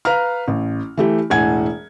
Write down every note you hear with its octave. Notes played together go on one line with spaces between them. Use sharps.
B4 F5 A#5 F6
A1
E3 A3 G4
E1 A2 F#5 G#5 G#6